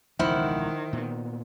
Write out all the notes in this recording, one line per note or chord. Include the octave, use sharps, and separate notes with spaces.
E1 C#2 D#3 F3 E4 C5 F#5 F6
A#2 B3